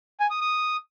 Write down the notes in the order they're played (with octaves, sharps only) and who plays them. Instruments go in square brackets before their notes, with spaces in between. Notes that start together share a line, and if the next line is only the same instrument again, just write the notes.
[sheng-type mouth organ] G#5
D#6
D#6